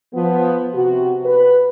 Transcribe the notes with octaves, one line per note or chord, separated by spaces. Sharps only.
F3 B3
C3 F#4
B4